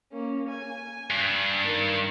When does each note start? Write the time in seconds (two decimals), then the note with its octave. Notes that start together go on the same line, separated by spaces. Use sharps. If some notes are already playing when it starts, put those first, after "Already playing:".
0.12 A#3 C#4
0.48 G#5
1.10 G2
1.65 D#3